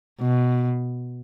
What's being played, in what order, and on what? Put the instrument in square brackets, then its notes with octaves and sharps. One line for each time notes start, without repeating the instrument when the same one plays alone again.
[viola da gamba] B2